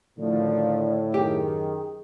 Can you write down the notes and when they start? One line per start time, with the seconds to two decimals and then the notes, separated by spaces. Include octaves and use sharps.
0.19 A2 D3 D#3 F3 D5
1.14 F#2 D#3 G4 G#4